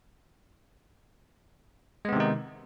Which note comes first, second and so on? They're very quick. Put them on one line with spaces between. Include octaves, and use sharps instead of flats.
G#3 B3 C3 D#3 D#4